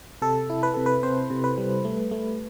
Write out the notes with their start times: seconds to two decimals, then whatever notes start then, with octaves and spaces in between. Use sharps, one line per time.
0.22 C3 A4
0.50 E4
0.63 B4
0.74 C3 A4
0.86 B4
1.03 C4 C5
1.30 C3
1.44 B4
1.58 G3
1.85 A3
2.11 A3